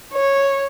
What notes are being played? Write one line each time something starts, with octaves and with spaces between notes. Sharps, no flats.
C#5